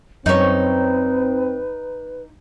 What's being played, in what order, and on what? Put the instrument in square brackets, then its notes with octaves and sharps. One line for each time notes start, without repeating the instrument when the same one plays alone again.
[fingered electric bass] F#2 [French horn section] C4 [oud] D#4 C#5 [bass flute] B4